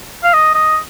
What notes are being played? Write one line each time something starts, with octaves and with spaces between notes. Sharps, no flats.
F5
D#5
D#5